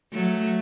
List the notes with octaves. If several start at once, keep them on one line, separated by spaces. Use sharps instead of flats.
F#3 A3